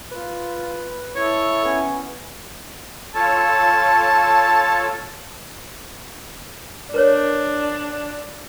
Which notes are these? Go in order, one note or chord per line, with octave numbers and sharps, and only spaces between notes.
F4 B4
E4 A4 C#5
B3 C#4
F4 A4 C#5 A5
D4 A#4 B4 C#5